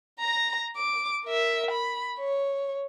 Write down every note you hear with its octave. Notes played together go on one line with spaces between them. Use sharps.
A#5 A#6
D6
A#4 E5
B5
C#5